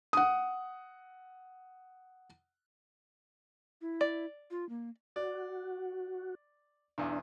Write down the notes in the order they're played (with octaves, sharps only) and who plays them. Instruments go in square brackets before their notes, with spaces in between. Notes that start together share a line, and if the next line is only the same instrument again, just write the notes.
[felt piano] F#5 D#6
[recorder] E4
[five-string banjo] D5
[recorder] F4
A#3
[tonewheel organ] F#4 [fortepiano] D5
[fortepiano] B1 E2 [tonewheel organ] D4